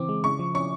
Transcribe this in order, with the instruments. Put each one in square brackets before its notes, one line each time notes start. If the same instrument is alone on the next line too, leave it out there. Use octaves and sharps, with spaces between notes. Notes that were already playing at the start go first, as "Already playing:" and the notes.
Already playing: [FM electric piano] C#3 E3 C4 [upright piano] D6
[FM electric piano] G#3
[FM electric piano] C#3 [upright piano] C#6
[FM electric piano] F3
[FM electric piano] C#4 [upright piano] C#6